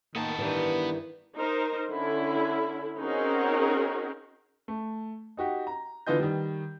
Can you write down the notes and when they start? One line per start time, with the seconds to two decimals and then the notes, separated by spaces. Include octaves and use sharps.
0.16 D#3 A#3 B3 A5
0.39 G2 D#3 E3
1.36 D#4 A#4 C5
1.89 D3 C#4 E4
2.98 C4 C#4 D#4 F#4 G#4 A#4
4.68 A3
5.37 D#4 F#4 G4
5.67 A#5
6.07 D3 E3 B3 F4 D#5 G6
6.20 D#3 G3